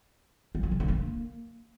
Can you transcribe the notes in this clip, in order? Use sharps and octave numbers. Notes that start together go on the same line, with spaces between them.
G3
F#3
C3
D3
A#3